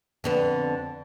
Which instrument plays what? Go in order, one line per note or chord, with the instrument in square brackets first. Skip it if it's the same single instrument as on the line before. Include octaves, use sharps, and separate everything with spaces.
[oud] F2 D3 B3